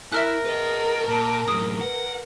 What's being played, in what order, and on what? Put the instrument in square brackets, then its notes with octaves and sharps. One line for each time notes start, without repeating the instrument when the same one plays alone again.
[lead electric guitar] E4 [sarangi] A#4 [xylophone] E5 F6 F#6
[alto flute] G#4 [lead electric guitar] B4 D#5
[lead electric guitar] A#2 [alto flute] A5
[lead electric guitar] F#2 A2 [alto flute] G#4 [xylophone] D#6
[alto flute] B4 [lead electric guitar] F#5